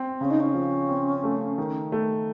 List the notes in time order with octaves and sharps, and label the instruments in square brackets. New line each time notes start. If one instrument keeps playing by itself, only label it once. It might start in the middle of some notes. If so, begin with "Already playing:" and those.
Already playing: [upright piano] C4
[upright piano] C#3 [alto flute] C#4
[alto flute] D#4
C#4
[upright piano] F3
C4
A3
D#3
A3